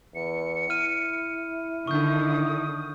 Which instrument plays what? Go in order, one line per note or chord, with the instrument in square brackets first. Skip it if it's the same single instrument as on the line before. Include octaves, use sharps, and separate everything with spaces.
[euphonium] E2 [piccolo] C#7
[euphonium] E4 [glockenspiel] F6 D#7
[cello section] D3 D#3 [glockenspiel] C#6 G6 [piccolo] D#6